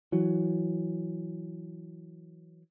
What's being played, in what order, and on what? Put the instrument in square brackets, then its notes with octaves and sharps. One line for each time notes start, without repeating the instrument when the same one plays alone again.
[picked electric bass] E3 F#3